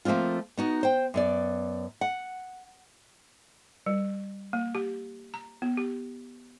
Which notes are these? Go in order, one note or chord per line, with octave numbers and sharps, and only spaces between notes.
F3 A3 A#3 C4 F4
B3 D#4 F#4
C5 G5
F#2 B3 D5
F#5
G3
A#3
G4
A#5
B3
G4